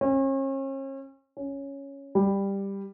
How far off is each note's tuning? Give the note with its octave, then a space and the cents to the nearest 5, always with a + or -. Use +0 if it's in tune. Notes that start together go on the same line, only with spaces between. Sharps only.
C#4 -40
C#4 +0
G3 +10